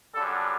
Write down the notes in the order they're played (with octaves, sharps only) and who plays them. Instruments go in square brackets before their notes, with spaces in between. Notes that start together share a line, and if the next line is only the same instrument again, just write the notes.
[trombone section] F#2 D3 G3 A4